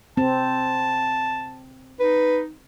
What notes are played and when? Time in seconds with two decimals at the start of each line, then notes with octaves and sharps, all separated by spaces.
0.17 C4 A5
2.00 D#4 B4